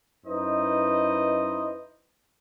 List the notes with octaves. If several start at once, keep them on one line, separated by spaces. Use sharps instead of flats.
F#2 D#4 E4 B4 C5 D#5